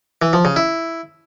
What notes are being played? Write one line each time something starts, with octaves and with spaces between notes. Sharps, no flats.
E3
F3
C#3
E4